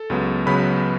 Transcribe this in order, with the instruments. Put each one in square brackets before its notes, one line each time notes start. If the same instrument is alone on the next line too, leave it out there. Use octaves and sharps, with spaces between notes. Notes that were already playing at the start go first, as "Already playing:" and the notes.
Already playing: [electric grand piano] A4
C#2 C#3 F#3 B3
C#2 C#3 F#3 B3 B4 B5